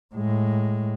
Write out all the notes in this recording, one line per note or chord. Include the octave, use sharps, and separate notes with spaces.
A2 G#3